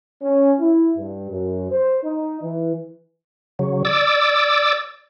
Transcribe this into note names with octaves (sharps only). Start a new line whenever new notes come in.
C#4
E4
G2
F#2
C5
D#4
E3
C#3 F#3
D5 D6 E6